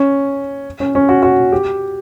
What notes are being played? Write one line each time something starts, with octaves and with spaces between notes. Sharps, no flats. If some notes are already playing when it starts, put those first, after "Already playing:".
Already playing: C#4
C#4
C#4
F#4
F#4
G4